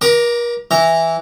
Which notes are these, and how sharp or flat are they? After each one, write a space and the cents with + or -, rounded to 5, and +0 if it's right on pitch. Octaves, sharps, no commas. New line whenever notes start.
A#4 +40 A#5 +0 D6 +0
E3 -5 A#5 +0